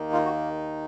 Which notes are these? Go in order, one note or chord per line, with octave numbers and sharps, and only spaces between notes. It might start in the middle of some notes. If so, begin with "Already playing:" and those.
Already playing: D#2 D#3 A#3 D#4
F4
F#4